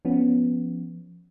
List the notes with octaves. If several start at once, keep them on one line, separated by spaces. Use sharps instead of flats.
F3 B3 C#4